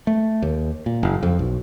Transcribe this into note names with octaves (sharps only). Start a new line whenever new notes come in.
A3
D#2
A#2
F#1
F2
B1